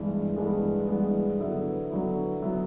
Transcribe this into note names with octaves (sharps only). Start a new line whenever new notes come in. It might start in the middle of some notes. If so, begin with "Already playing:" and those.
Already playing: G2 E3 G#3 B3
G2 E3 G#3 B3
G2 E3 G#3 B3
D3 F#3 B3 E4
D3 F#3 B3 E4
D3 F#3 B3 E4